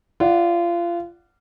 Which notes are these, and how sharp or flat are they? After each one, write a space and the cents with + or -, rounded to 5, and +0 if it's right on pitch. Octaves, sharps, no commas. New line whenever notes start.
F4 -25 D5 +0 F#5 +0